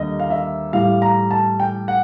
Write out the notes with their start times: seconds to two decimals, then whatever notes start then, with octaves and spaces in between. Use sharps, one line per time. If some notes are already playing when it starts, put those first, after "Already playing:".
Already playing: D#2 D3 G3 D#5
0.20 F5
0.30 E5
0.73 A2 E3 G3 F5
1.02 A#5
1.31 A5
1.60 G5
1.88 F#5